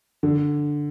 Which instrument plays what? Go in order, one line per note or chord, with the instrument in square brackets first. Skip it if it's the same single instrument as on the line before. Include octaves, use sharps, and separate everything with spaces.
[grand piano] D3